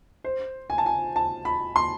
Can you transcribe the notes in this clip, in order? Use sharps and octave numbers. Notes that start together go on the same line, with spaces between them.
C5
G#5
A5
G#5
A5
B5
C6